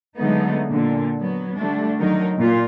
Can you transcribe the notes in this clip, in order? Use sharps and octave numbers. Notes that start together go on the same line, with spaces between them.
D3 F#3 G#3 A3 B3 D#4
A#2 D3
F#3 B3
D3 G3 A3 D4
D3 D#3 F#3 D#4 A#4
A#2 F4